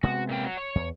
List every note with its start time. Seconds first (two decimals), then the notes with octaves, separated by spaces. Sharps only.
0.03 C3 G#3 B3 F#4
0.29 A#2 A#3 G5
0.44 F#3
0.57 C#5
0.75 E2